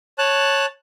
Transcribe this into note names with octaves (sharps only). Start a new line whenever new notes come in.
C#5 A5 F#6